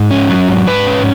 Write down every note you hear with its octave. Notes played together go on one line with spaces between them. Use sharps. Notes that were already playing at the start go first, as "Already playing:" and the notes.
Already playing: G#2
C#4
F#3
G#2
G#2 B4
C#4